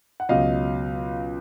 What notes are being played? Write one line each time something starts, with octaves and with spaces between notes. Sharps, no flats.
F#5
C#2 B2 F#3 D#5 F5